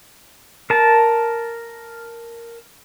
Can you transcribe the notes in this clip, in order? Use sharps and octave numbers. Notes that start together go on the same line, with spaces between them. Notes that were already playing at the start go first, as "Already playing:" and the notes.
A#4 A5